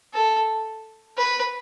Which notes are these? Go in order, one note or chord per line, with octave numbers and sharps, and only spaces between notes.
A4
B4